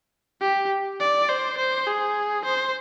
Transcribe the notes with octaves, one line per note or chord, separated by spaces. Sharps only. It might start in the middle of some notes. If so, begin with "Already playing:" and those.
G4
D5
C5
C5
G#4
C5